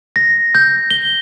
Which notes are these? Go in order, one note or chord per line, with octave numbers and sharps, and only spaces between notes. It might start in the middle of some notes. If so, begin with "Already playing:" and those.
A#6
G6
G7